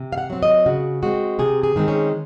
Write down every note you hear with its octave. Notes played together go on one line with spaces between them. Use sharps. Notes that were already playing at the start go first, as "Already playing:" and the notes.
Already playing: C3
F5
F#5
F#3 C4
D#5
C#3 F#4
G#3 C4 F#4
C3 G#4
G#4
D#3 G#3 C4
C#4